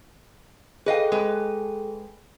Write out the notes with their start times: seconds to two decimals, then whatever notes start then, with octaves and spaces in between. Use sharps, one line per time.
0.86 G#4 A4 B4 D#5 F5 G5
1.12 G#3 B4